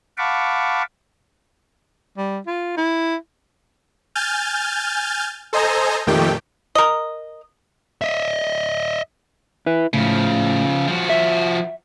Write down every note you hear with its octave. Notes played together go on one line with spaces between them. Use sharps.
F5 F#5 A5 B5 C#6 D6
G3
F4
E4
G#5 F6 G6 A6
A4 C5 D#5 G#5 A#5
F2 A#2 D#3 A3 G4 G5
A#4 D#5
D#5 E5
E4 B4
A2 C#3 F3
F3 F#4
E5